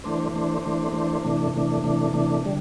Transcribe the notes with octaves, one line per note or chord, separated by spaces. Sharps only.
E3 A3 D4 C5
E3 A3 D4 C5
E3 A3 D4 C5
E3 A3 D4 C5
C3 E3 A3 D4
C3 E3 A3 D4
C3 E3 A3 D4
C3 E3 A3 D4
D3 G3